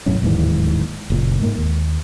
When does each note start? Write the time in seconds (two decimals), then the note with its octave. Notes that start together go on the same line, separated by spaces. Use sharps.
0.06 B1 F#2 A2 C#4
0.22 D1 D#2 G#2 E3
1.10 F#1 A#2
1.41 G#2 A#3
1.58 D#2